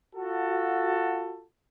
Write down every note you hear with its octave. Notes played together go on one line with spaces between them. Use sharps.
F4 F#4 A4